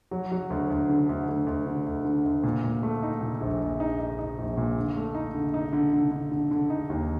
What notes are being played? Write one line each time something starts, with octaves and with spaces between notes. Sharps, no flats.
F#3
F#3
D2
D2
D3
D2
D2
D2
D3
D2
D3
D2
A#2
A#2
A3
D#4
A#2
A#1
A#1
D#4
D#4
D#4
A#1
A#2
D3
A3
D#4
D3
D#4
D3
D3
D3
D3
D3
D#4
D#2